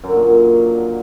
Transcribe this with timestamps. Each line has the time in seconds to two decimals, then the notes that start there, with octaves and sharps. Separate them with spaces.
0.04 F#2
0.10 D3
0.16 A#2